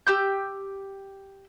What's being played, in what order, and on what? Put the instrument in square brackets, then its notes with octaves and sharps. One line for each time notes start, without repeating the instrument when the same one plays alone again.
[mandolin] G4 E6 G6